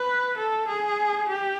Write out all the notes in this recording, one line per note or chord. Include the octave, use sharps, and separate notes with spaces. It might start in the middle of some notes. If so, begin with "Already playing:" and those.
Already playing: B4
A4
G#4
G4